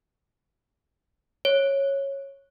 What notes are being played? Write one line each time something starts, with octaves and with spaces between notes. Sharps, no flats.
C#5